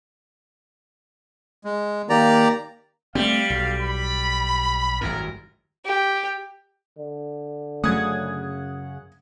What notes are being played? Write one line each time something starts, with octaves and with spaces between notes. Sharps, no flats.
G#3
D#3 A#3 G4 D5 A#5
G3 A3 B3 C4 F5
B1
B5
G#1 F#2 A2 A#4
G4
D3
F#2 C#3 F#3 A3 F#5 D#6 G#6